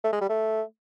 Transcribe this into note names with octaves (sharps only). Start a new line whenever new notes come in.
A3
G#3
G3
A3